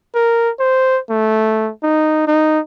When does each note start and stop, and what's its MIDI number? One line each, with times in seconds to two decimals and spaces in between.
0.15 0.50 70
0.59 0.99 72
1.10 1.71 57
1.83 2.24 63
2.27 2.60 63